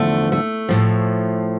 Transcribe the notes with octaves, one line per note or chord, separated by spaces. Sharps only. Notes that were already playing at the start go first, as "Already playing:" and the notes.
Already playing: E2 D3 F3 A3
A3
A2 F3